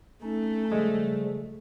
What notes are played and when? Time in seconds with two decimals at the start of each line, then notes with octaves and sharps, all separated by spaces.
0.23 A3 C#4 D#4
0.72 C#3 F3 G3 G#3